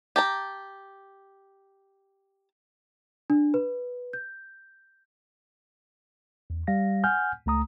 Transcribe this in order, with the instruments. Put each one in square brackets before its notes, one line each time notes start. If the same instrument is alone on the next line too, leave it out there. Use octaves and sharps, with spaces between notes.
[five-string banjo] G4 A5 A#5
[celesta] D4
B4
G6
[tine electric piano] E2
G3 F5 A#6
F#5 G#5 F6 G6
C#2 A3 A#5 D#6